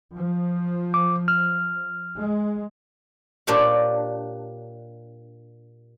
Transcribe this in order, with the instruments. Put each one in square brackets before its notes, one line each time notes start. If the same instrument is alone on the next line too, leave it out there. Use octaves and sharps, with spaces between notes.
[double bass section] F3
[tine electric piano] D6
F6
[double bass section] G#3
[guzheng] A#2 D4 G4 C5 C#5 F5